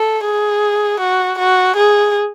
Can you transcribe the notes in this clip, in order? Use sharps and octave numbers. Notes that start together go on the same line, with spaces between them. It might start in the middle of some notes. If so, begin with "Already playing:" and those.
Already playing: A4
G#4
F#4
F#4
G#4